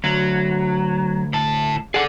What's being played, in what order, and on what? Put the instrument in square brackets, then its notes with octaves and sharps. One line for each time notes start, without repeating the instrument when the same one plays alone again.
[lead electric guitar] D2 [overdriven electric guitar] F#3
[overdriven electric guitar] A2 A5
[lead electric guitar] G#4 F#5 [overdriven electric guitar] A4 D5